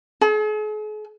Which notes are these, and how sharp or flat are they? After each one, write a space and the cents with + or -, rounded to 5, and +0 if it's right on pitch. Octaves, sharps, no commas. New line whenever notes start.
G#4 +45